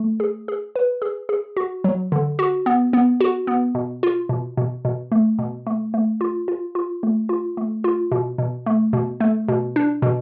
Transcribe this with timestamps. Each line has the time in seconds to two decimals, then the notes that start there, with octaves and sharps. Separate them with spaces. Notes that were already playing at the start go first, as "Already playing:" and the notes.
Already playing: A3
0.20 G#4
0.48 G#4
0.76 B4
1.02 G#4
1.29 G#4
1.57 F#4
1.84 F#3
2.12 D3
2.39 F#4
2.66 B3
2.93 B3
3.21 F#4
3.47 B3
3.75 B2
4.03 F4
4.29 B2
4.57 B2
4.85 B2
5.12 A3
5.39 B2
5.67 A3
5.94 A3
6.21 F4
6.48 F4
6.75 F4
7.03 A3
7.29 F4
7.57 A3
7.84 F4
8.12 B2
8.38 B2
8.66 A3
8.93 B2
9.20 A3
9.48 B2
9.76 D4
10.02 B2